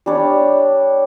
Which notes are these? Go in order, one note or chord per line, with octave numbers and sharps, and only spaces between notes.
G3 D4 C#5